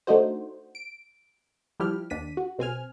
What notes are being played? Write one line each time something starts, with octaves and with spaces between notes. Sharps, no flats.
A3 D4 D#4 F#4 C5
D7
F3 G3 E4 G4 F6
D#2 D4 B6 D#7
F#4
B1 C4 G#5 F6